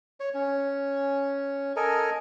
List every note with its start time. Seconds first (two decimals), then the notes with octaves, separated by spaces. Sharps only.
0.20 C#5
0.34 C#4
1.76 A4 A#4 D#5 G#5